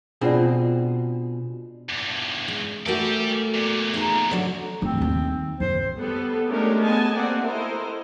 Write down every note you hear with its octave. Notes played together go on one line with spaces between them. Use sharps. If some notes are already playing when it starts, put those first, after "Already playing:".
B2 C4 D4 F4 G#4 D5
E2 G2
G#3
A3 C4 F#4 G4 A#4 D5 G#5
E2 A#2 D5
D#4 G#4 A4 A#5
D3 F#3 C#5 C6 C#6
D#3 A3 C4
D#2 D#3
F#1 F#2 C5
G3 B3 A4
G#3 A3 C#4 D4 G4 A#4
B3 D#5 G#5 A5
A#3 C4 G4 D5 F#5
E4 A4 A#4 C5 D#5